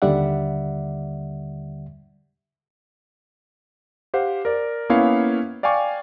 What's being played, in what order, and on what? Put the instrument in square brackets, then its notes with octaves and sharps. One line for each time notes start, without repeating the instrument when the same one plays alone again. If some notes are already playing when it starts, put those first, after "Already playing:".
[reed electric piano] D#2 D3 G3 D5 E5 F#5
[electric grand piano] G4 C5 F5 F#5
A#4 D5
A#3 B3 C#4 E4 C#5 F5
D5 F5 G5 G#5 C#6 D6